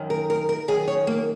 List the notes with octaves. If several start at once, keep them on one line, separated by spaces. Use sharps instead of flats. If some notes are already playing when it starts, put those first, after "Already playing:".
Already playing: F#2 D#3
A#4
A#4
A#4
F#2 D#3 G#4
C#5
A#3